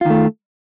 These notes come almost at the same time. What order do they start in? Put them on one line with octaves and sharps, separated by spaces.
F4 D#3 A3